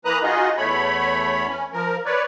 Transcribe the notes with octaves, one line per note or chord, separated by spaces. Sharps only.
E3 A#3 B4 A#5 D#6 F#6
D#4 F4 F#4 G#4 D#5
E2 A3 C#5 B5
C#4
F3 A#4
B4 C#5 D5